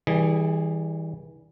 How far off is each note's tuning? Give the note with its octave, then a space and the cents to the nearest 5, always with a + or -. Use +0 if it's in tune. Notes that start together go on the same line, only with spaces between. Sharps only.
E3 -35 G3 +0 G#4 +0